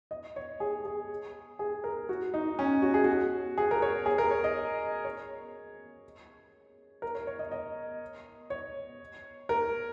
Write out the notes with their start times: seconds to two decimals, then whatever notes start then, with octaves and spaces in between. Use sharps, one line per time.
0.11 D#5
0.36 C#5
0.60 G#4
0.85 G#4
1.59 G#4
1.84 A#4
2.09 F#4
2.34 D#4
2.59 C#4
2.82 F#4
2.94 G#4
3.04 F#4
3.58 G#4
3.71 A#4
3.82 C#5
4.06 G#4
4.18 A#4
4.31 C#5
4.44 D#5
5.05 C#5
7.02 A#4
7.15 C#5
7.27 C#5
7.39 D#5
7.52 D#5
8.50 C#5
9.49 A#4